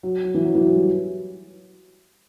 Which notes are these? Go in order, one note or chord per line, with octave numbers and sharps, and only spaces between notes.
F#3
F#3
E3
F#3
E3
F#3
G3